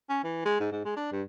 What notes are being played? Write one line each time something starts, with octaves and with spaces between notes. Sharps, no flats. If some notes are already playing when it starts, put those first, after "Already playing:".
C#4
E3
G#3
G#2
G#2
G#3
D4
G2